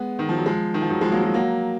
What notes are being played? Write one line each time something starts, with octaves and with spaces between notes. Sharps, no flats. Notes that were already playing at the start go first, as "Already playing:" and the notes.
Already playing: G#3 B3
D#3
F3
F#3
F3 G#3
D#3
F3
D#3 F#3
F3 G#3
F#3 A#3
F#3 A#3
F#3 A#3